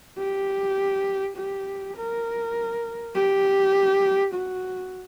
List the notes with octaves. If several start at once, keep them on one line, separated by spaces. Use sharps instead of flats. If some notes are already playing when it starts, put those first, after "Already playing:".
G4
G4
A#4
G4
F#4